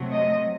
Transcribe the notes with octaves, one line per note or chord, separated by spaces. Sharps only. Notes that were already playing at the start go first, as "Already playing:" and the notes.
Already playing: C3 F#3 A3
D#5